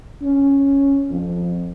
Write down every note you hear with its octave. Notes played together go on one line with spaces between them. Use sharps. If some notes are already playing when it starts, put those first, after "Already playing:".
C#4
F2